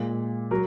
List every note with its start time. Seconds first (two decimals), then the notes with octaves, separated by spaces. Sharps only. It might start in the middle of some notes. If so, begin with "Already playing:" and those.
Already playing: A#2 G#3
0.51 F#3 A#4